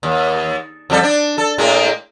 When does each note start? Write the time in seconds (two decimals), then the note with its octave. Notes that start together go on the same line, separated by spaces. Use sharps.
0.03 D#2
0.90 F2 G3 A4
1.03 D4
1.38 A4
1.58 A2 G#3 A#3